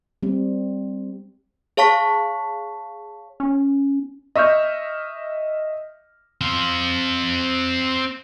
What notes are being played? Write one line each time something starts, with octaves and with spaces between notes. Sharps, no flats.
G3 C4
G#4 C#5 F5 A5 C#6 B6
C#4
D#5 E5 C#6 F6 G6
C4 F5